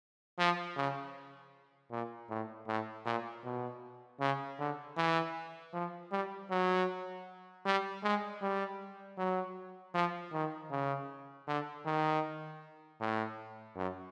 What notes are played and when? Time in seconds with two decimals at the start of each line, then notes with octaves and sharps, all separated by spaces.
0.39 F3
0.77 C#3
1.91 A#2
2.30 A2
2.68 A2
3.06 A#2
3.44 B2
4.20 C#3
4.59 D3
4.97 E3
5.74 F3
6.12 G3
6.51 F#3
7.66 G3
8.03 G#3
8.42 G3
9.18 F#3
9.95 F3
10.33 D#3
10.71 C#3
11.48 D3
11.86 D#3
13.00 A2
13.76 F#2